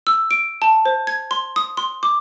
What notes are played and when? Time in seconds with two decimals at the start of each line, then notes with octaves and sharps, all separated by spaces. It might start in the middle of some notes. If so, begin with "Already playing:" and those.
0.07 E6
0.31 D7
0.62 A5
0.85 C5
1.07 G#6
1.31 C6
1.56 D#6
1.77 C6
2.03 D6